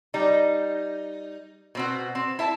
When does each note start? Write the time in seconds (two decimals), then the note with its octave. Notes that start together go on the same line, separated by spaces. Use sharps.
0.14 G3 D#4
1.75 B2 C4 F#4
2.15 C4
2.39 E4 E5 A5